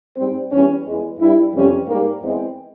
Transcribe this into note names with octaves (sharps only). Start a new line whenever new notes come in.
G#2 G3 C4
E2 E3 G3 C#4
E2 E3 G#3
G2 G3 E4
F2 C3 E3 G3 C#4
G#2 G3 A#3
E2 E3 G#3 C4